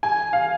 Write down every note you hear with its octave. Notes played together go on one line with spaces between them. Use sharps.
G#5
F5